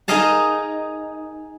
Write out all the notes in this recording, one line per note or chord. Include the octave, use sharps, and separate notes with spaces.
D#4 G#4 A#4 D#5 F5 A5